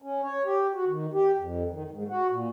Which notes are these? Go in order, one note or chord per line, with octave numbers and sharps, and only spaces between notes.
C#4
C#5
G4
F#4
D#3
G4
F2
D#3
G#2
F#4
A#2